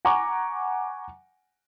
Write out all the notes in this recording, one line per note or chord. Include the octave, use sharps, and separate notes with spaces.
F#5 G#5 A#5 C#6 D6